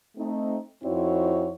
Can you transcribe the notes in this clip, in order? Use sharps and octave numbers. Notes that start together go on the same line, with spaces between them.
A3 C4 D#4
F2 C4 D#4 E4 F#4 C#5